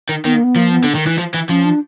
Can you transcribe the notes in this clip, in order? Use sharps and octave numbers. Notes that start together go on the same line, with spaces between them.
D#3
D#3 B3
A#3
B3
F3 A#3
B3
D3
D#3
E3
F3
E3
F3 C#4
D4